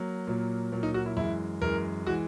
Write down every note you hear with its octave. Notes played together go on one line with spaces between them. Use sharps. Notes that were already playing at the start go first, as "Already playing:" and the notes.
Already playing: F#3 A#3
A#2 F#3 A#3
A#2 F#3 A#3
D#4
F#4
E4
F#2 E3 G#3 E4
F#2 E3 G#3 A#4
E3 G#3 F#4